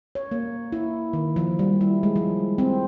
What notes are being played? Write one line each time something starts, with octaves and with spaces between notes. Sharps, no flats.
C#5
A#3
E4
D#3
F3
G3
E4
G#3
F3
C4